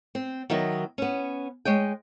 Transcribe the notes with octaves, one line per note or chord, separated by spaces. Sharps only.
C4
D#3 F#3 B3 D#5 E5
B3 C#4
G#3 C#5 D#5 G5